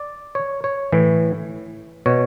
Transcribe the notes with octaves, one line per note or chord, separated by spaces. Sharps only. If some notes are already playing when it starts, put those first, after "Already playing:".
Already playing: D5
C#5
C#5
A2 E3
B2 C#5